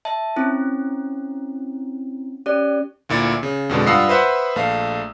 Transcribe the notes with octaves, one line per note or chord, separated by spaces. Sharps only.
E5 A5
C4 C#4 E4
C#4 G4 D5
D2 A#2 E4 A6
C#3
F2 B2 D3 G#3
G2 F4 F#5 D#6 E6 C7
B4 C5 E5 F#5
A#1 A3 F5